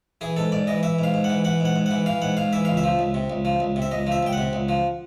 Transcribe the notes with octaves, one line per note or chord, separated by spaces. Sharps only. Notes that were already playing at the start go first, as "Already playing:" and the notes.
E3 G#4
G#2 A4
G#2 D5
E3 D#5
E3 E5
G#2 F5
G#2
F#5
E3
E3 F#5
G#2 F#5
G#2
E3 F#5
E3 F5
G#2 F#5
G#2 F5
E3 E5
C#2 F5
E5
F3
C#2
C3
C#2
F3
C#2
C3
E5
C#2 D#5
F3
E5
C#2 G5
C3 F#5
C#2
F3